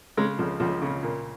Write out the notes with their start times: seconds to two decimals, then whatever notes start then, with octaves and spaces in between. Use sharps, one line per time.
0.17 C#3 G#3
0.39 C#2 F3
0.60 C#2 F3
0.82 C#3
1.03 A#2